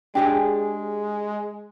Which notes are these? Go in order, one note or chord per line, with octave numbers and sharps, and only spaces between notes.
G#3 D4 G4 G#4 G5